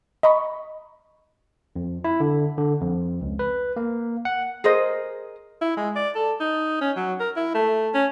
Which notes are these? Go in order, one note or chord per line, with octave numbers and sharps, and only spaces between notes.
D#5 A#5 B5 C#6
F2
E4
D3
D3
F2
C#2
B4
A#3
F#5
G#4 A#4 C5 D#5
E4
G#3
D5
A4
D#4
C#4
F#3
A#4
E4
A3
C#4